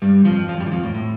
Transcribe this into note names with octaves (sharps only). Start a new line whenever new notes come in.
G2 G3
F2 F3
F2 F3
G2 G3
E3
F2 F3
A2
A2